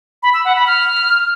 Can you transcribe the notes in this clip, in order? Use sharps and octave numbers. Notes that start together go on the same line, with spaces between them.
B5
E6
F#5
B5
F6